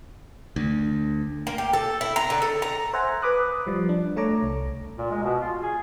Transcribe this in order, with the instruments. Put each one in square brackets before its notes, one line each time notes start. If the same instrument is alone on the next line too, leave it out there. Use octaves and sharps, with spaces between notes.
[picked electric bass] D2
[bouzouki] A#3
G4
A4
E4
A#5
D3
A4
A#5
[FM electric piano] C5 E5 F#5 G#5 A#5
B4 B5 D6 D#6 F#6
F3 G3
D4
A3 A4 C#5 A#5 D6
C2
[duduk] A#2
G#3
B2
F4
G#4